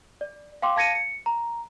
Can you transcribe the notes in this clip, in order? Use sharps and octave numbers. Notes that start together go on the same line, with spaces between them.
D5
F5 G5 C6 D6
F5 A5 G#6 A#6 C#7 D#7
C#7
A#5